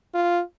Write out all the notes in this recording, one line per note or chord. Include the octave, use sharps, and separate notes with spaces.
F4